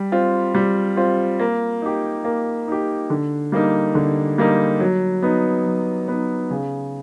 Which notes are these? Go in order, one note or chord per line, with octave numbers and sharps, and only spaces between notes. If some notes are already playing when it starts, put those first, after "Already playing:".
Already playing: G3
C4 F4
G3
C4 F4
A#3
D#4 G4
A#3
D#4 G4
D3
G3 A#3 D#4
D3
G3 A#3 D#4
F#3
B3 D#4
F#3
B3 D#4
C#3